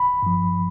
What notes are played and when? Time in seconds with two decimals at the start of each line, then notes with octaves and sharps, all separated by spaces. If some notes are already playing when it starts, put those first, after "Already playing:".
Already playing: G1 B5
0.22 G2 F3